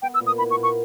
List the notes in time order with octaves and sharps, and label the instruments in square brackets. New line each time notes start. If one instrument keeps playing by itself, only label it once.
[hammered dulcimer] B3 [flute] G5
[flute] E6
[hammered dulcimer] A#2
[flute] D#6
[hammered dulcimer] E4 [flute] B5
[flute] C#6
[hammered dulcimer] A#2
[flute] C#6